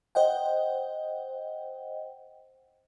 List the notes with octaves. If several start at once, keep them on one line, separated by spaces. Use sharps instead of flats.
C5 D#5 F#5 G5